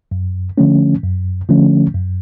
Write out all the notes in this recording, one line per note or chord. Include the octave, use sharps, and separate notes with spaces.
F#2
D3 F3 A3 C#4
F#2
D3 F3 A3 C#4
F#2